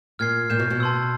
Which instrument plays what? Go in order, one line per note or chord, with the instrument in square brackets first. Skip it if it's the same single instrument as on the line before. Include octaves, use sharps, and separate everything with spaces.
[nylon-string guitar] A#2 [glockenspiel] F6 G#6 C7
[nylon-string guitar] A#2 [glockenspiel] G6 C7 E7
[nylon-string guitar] B2
B2
[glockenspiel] A5 C6 E6